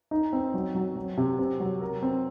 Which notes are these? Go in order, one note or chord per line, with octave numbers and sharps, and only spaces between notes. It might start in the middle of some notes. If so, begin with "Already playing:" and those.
D#4
C4
F#3
F#3
F#3
C3
C4
F#3
A#4
C4